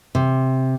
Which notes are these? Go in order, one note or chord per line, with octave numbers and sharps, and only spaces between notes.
C3